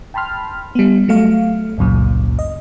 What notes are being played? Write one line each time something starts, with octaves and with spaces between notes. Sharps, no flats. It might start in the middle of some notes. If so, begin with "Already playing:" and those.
G5 A5 B5 C6 F6
G3 B3
F#3 A3 F5
G#1 C#2 F#2 A#2
D#5